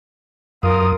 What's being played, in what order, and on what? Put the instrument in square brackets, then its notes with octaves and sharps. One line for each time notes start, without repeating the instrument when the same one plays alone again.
[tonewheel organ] F#2 D#6 [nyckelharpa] F4 A#4